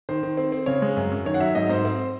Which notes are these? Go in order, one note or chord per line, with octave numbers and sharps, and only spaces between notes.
D#3 C5
D#3
C4
C4
C#3 C#5
G#3
F#2
F#2
D#3 C#5
F#5
F#3 E5
G#2 D#5
G#2 C5
C4